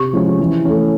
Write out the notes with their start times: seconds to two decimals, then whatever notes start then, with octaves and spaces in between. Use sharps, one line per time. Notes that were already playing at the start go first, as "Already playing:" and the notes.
Already playing: C3 G4
0.13 F3 G#3 C#4 F4
0.39 E3
0.65 A3 C#4